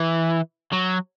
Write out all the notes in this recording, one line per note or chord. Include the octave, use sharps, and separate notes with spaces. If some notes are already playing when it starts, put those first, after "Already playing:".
Already playing: E3
F#3